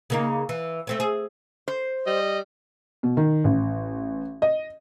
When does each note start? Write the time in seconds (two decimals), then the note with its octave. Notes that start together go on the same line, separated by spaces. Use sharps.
0.10 C#3 A#3 D#4
0.49 E3
0.87 A3 C4 C#4
1.00 G#4
1.68 C5
2.07 G3 D#5
3.03 B2
3.17 D#3
3.44 A1
4.42 D#5